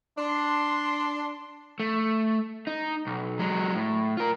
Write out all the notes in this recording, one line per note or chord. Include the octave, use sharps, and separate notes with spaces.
D4 C6
A3
D#4
B1
F#3 G#3
A2
F4 A#4